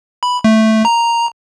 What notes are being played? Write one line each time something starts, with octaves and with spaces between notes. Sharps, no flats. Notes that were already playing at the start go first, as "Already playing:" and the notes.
B5
A3
A#5